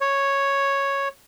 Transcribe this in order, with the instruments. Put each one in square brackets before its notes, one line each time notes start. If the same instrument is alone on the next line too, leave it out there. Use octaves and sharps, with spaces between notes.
[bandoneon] C#5